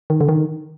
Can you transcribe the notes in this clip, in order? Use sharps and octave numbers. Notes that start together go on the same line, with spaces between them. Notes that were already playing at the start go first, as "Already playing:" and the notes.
D#3
D3
D#3